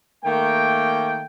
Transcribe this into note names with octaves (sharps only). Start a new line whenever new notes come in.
D#3 A3 A#3 G5